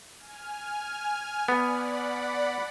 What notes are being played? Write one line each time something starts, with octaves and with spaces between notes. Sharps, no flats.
G#5 F6
B3 D5 F#5 B5